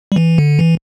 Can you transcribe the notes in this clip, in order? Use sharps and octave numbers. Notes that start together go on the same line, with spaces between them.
G3
E3
D3
E3